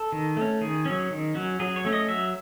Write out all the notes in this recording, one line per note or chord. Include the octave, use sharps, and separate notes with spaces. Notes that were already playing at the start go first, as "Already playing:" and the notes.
Already playing: A4
D#3
A3 C#4
D#3 G#4
F#3 C#4
D#3
F#3 C#4
F#3 G#4
C#5
A3 C#4
D#5
F#3 E5